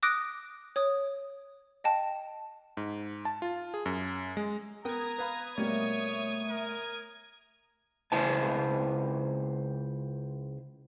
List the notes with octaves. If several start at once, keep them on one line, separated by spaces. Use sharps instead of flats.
D6 D#6 F#6 A#6 D7
C#5 D#6
D#5 G5 A5
G#2
A5
F4
G#4
F#2
G#3
B3 A#4 G5 A#5 D#6 G#6
B4 F5 B5
B2 G3 A3 A#3 C#5
A#4
C#2 E4 C5 G#5 A5